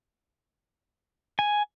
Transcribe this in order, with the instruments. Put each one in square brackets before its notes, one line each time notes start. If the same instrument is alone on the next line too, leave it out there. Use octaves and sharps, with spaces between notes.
[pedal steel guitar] G#5